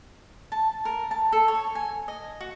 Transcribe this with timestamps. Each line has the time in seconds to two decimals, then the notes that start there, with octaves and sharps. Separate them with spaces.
0.52 A5
0.85 A#4
1.11 A5
1.32 A4
1.48 C#5
1.75 G#5
2.08 D#5
2.41 F#4